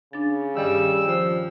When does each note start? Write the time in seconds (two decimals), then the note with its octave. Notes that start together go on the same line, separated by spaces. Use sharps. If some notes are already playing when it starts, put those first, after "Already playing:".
0.13 C#3 D4 A6
0.57 G2 D#3 G3 E6
1.06 F3